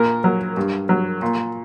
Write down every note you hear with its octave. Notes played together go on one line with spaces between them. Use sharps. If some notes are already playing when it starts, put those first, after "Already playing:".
Already playing: A#2 A#4
F#3
G2
F#3
A#2